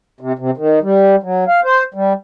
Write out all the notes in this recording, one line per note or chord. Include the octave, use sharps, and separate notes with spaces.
C3
C3
D#3
G3
F#3
F5
C5
G3